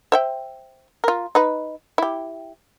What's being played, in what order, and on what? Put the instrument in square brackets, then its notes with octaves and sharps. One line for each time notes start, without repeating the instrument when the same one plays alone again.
[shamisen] C5 E5 G5
F4 A#4
D#4 B4
E4 G4